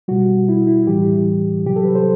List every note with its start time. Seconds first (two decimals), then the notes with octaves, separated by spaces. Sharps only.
0.08 B2 G3 F#4
0.49 E4
0.67 E4
0.87 A2 E3 G3 G4
1.65 C3 F#3 G4
1.76 A4
1.85 B4
1.95 C5